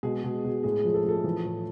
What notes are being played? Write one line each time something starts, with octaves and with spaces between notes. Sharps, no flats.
B2 G#3 G#4
B2
B2
A2 G#3 G#4
F3
A4
F3 A3 A4
E3
A2